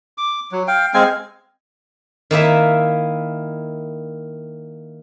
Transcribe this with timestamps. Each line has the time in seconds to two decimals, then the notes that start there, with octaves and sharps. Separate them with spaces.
0.18 D6
0.52 F#3
0.68 F5 G5
0.94 G#3 C4 F5 G#5
2.31 D#3 A#3 E4 E5